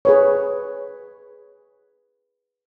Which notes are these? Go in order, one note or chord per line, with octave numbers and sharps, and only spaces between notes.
G#4 B4 C#5